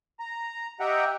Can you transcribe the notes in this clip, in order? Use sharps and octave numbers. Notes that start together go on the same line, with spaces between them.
A#5
G4 D#5 E5 F#5 G5 A#5